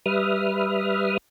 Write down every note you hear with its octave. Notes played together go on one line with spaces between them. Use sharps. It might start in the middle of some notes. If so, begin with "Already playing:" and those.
G3 B4 E5 D#6 F6